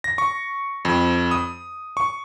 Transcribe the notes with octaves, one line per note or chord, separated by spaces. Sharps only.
A#6
C#6
F2
D#6
C#6